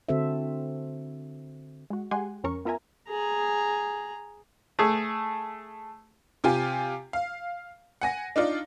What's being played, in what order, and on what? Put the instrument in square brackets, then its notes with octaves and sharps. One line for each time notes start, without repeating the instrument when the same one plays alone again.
[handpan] D3 C4 F#4 A4 C5 E5
[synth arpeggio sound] G#3 F#4
G#3 G4 F#5 G#5 C6
F2 C#4 A#4 C#6
B3 F4 A#4 E5 G#5 A#5
[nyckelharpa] G#4 A#5
[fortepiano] A3 G#4
[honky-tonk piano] C3 F4 G4 G#5
F5
F#5 G#5 A#6
D4 D#4 F4 D5